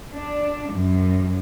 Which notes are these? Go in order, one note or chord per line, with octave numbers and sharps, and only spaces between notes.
D4
F#2